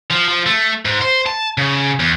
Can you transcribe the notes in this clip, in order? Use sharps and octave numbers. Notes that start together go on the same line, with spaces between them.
F3
F3
A3
G#2
C5
A5
C#3
E2